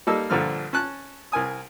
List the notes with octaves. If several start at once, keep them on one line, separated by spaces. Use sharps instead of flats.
G3 A#3 D#4 A4 E6
A#1 G2 D3 F3 F6
C#4 A5 F#6
C2 A#4 G#5 D#6